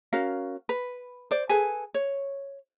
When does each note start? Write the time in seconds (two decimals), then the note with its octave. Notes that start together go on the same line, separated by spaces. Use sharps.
0.13 C#4 F#4 A#4 F5
0.69 B4
1.31 C5 D5
1.49 G#4 A4 B4 G#5
1.94 C#5